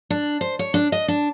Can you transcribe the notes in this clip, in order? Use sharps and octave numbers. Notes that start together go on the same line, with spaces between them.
D4
C5
C#5
D4
D#5
D4